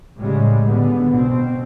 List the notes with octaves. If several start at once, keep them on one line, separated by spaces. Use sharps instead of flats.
A2 C#3 G3 G#3
D3 B3
B2 C4